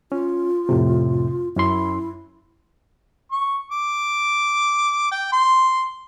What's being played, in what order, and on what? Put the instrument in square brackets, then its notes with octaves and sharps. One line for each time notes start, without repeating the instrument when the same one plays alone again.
[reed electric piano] C#4 [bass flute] F4
[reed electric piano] F2 A2 C3
[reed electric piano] F#2 C#4 C6 [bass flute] E4
[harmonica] C#6
D6
G5
C6